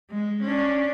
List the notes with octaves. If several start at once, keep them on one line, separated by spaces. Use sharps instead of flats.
G#3
C#4 D4